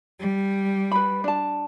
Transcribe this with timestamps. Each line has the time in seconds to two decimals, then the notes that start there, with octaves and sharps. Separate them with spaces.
0.20 G3
0.92 B4 B5
1.24 D4 A5